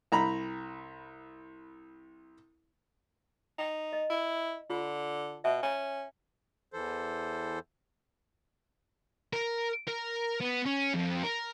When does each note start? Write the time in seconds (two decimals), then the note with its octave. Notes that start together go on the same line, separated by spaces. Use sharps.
0.12 C2 A#5 B5
3.58 D#4
3.93 D#5
4.10 E4
4.70 D3 F4
5.44 B2 E5
5.63 C#4 G#5
6.73 E2 E3 A4 C5
9.33 A#4
9.87 A#4
10.40 B3
10.66 C#4
10.94 F2
11.23 A#4